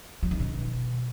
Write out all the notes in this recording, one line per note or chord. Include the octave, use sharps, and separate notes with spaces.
F#3
D#3
B2